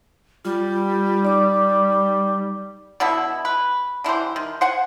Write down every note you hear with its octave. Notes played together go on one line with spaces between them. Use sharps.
G3 F4
D#4 D5 D6
B2 D3 B3 E4
B4
D3 E3 G3 C5
D#3
C5 F#5 G#5